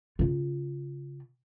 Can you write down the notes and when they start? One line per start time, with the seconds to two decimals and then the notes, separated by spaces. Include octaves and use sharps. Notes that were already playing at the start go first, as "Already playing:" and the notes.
0.19 C#3 F4